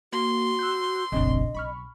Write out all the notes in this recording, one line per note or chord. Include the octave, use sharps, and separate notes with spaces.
A#3 F#4 C6
E6 F#6 G6
F1 A#1 C#3 C4 D4 D#5
B1 B5 C#6 F6